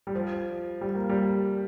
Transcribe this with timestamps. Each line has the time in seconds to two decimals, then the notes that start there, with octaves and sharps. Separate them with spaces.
0.07 G3
0.15 F3
0.81 G3
0.95 A#3
1.09 G3